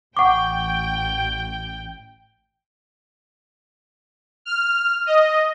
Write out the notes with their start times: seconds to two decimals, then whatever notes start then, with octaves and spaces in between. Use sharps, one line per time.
0.17 A1 F#5 G5 C#6 D6
4.45 F6
5.06 D#5